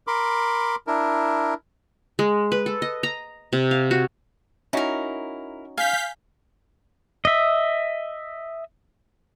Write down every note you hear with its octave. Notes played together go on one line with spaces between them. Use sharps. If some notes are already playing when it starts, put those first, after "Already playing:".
A#4 B5 C6 D6
D4 E4 A#4
G#3
B4
A4
D#5
A#5
C3
F5
F#4
C#4 D#4 E4 F#4 A#4
F5 G#5 G6 B6
D#5 E5